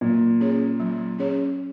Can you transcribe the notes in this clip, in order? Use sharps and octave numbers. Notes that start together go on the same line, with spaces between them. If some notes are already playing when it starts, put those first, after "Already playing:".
A#2 F#3
C#4 G#4 C#5
F#3
C#4 G#4 C#5